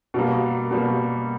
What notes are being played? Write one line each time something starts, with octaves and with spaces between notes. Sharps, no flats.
B2 G3 A#3
B2 G3 A#3